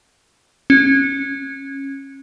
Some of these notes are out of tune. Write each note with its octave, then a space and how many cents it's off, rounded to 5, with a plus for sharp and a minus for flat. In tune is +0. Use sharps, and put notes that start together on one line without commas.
C#4 -15